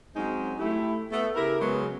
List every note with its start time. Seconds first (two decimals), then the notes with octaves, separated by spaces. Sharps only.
0.16 F#3 G#3 C4 C#4 D#4 C5
0.60 A3 E4 G4
1.12 A3 B3
1.35 C#3 E4 G4 A#4
1.61 C#3 F#3 G#3 B3